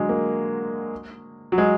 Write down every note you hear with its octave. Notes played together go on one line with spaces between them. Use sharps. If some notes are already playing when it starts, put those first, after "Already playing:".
Already playing: D3 F#3 G#3
A#3
F#3
G#3